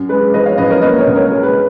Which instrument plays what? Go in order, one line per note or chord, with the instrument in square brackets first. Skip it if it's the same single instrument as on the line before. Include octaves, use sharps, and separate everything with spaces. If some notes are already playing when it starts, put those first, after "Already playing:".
Already playing: [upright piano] F#2
G#3 B4
F3 B4 D#5
C#5 F5
F#2 B4 D#5
A#4 C#5
A#3 B4 D#5
A#4 C#5
C#2
A#4 C#5
G#3
B4